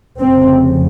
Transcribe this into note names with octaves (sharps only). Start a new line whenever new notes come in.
F1 F2 C#3 C4